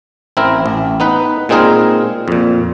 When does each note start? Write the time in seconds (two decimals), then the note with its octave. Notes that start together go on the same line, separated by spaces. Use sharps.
0.37 A1 C4 E4 A#4
0.66 A1
1.00 B3 D#4 B4
1.49 A#2 G#3 C4 D#4 G#4 A#4
2.28 F2 A#2